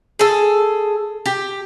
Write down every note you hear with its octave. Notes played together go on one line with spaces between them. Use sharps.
G#4 A4
G4